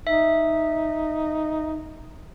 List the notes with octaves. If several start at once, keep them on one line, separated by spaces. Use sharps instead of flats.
D#4 E5